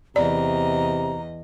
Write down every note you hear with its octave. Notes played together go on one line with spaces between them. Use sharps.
E2 C3 D5 D#5 A#5